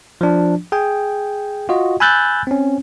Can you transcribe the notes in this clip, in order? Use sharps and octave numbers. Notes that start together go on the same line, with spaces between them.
F3 D4
G#4 G5 G#5
F4 F#4 D#5
G#5 B5 E6 F#6 G6 A6
C4 C#4